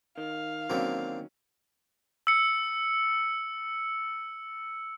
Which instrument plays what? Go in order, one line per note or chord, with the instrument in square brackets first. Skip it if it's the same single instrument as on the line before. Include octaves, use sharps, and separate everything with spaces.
[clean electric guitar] D#3 [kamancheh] F5
[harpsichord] D3 A#3 C4 [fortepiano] F#3 C#4
[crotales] E6 C#7